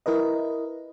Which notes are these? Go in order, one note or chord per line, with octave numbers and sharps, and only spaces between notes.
E4 A#4 B4 D#5